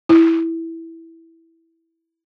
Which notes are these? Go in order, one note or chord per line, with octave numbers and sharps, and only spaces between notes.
E4